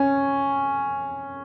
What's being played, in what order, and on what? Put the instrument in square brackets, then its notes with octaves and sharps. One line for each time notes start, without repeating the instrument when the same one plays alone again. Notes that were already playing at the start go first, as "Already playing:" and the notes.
Already playing: [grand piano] C#4